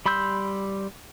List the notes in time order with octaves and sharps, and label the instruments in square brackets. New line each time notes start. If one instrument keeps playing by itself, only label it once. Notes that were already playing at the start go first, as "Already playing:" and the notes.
[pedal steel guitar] G3 B5 C6 E6 G6